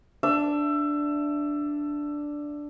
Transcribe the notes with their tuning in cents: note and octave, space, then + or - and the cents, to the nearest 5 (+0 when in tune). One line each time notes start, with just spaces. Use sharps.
D4 +0 E5 +20